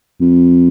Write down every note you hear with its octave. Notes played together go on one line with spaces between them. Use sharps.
F2